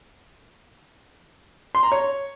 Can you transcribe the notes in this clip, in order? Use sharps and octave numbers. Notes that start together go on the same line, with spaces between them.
C6
A#5
C#5